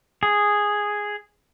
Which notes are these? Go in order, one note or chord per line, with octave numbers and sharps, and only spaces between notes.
G#4